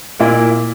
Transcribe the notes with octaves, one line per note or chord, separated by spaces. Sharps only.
A#2 A#3 E4